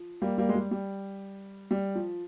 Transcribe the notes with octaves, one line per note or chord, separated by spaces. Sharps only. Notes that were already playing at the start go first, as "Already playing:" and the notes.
Already playing: F3
G3 A#3
G3 A#3
G#3
G3
G3
G3
F3